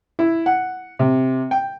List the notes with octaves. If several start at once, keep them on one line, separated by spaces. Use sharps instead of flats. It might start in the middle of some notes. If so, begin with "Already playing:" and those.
E4
F#5
C3
G5